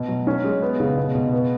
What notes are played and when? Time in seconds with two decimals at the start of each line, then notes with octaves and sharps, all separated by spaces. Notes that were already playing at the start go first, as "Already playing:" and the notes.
Already playing: B2
0.08 F#3
0.27 C#4
0.44 G#3
0.62 B3
0.80 C#3
0.97 B2
1.15 B2
1.32 B3